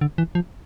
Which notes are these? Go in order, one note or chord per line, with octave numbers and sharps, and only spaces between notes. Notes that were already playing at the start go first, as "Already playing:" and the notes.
D3
E3
F3